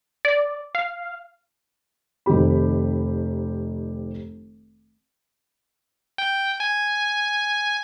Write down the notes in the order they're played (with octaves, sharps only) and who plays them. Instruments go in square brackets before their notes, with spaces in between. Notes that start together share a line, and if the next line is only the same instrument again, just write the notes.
[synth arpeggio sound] D5
F5
[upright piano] F1 D#3 C4 G4 B5
[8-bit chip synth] G5
G#5